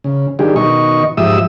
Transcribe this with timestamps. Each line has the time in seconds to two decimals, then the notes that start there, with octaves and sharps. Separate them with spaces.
0.04 C#3
0.39 D#3 G3 D4 G4 G#4
0.56 B2 D#3 D#5 C#6
1.17 G#2 F3 G4 E5 D#6 E6